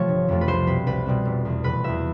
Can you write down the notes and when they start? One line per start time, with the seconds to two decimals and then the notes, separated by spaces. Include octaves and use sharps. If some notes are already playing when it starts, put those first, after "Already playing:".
Already playing: C3 F3 A3 C#5
0.08 G1
0.28 F2 C3 F3 A3
0.41 B4
0.47 C2 C5
0.66 B2 G3 C4 B4
0.86 C2 B4
1.06 B2 G3 C4
1.25 F1
1.45 E2 B2
1.64 F1 B4
1.84 E2 B2 E5